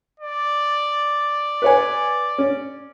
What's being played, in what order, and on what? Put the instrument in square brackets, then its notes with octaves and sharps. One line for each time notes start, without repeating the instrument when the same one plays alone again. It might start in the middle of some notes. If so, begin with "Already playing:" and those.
[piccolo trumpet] D5
[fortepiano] B4 C#5 G#5
C#4